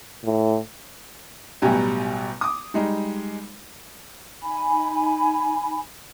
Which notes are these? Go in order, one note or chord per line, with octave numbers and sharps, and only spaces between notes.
A2
A1 B2 F#3 G3 G4 G#5
D6 D#6
G3 G#3 D#4
D#4 G#5 B5